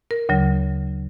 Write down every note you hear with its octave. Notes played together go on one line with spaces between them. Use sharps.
A#4
D2 C#3 F#3